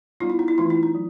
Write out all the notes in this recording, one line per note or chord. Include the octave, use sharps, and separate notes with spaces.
G3 B3 D#4 F4
E4
D#4
E4
E3 A3 C4 D#4 F4
E4
D#4
F#3